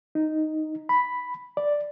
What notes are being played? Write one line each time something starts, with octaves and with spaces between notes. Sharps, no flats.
D#4
B5
D5